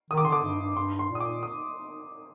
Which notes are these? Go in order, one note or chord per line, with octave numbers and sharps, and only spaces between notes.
D#3 D#6
D6
D3 C6
D6
G2
G2
G2 C6
C6
A#2
D#6
D6
D#6